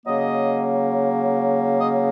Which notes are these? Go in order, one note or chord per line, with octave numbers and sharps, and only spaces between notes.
C#3 F#3 A#3 D#5
D#5